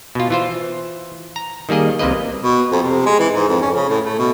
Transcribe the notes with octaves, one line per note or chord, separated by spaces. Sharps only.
B2 F4
E3 F4 C5
A#5
D#3 G3 A#3 G#4 D#5
C2 C3 A#3 B4 D#5
B2
F2
C3
G#3
E3
G#2
F2
C#4
C#3
A2
A3
B2